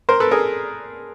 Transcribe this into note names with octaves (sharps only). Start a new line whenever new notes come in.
A#4 C5
A4 B4
G#4 A#4